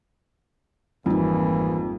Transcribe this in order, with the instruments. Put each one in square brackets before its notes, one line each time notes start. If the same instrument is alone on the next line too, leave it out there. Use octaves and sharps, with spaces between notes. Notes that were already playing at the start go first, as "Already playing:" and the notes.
[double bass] G#1 A#3 [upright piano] F2 [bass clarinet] E3 [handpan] G3 D#4